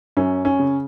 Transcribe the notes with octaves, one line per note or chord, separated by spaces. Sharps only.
F#2 C#4
C#4
C#3